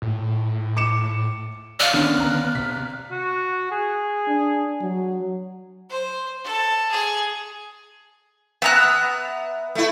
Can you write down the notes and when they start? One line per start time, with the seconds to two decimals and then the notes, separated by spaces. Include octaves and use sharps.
0.02 A2
0.77 D6 C#7 E7
1.80 D5 F5 F6
1.93 D3 D#3 B3 C#4
2.17 A#5 F#6
2.55 C3 B6
3.11 F#4
3.71 G#4
4.28 D4
4.81 F#3
5.89 C5
6.44 A4
6.91 G#4
8.62 B3 E5 A#5 F#6
9.75 A3 E4